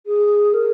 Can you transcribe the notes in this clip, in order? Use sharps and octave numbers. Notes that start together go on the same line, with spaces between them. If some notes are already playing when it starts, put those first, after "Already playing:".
G#4
A#4